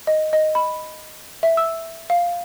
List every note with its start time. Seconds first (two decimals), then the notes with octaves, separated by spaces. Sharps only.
0.07 D#5
0.33 D#5
0.55 B5
1.43 E5
1.57 E6
2.10 F5